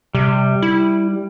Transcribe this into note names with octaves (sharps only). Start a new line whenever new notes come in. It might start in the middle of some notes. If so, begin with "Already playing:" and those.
C3 G3
E4